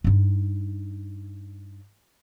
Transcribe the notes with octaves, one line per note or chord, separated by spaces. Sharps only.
G2 D#4